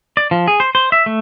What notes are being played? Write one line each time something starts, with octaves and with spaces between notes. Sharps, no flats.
D5
F3
G#4
C5
C5
E5
A3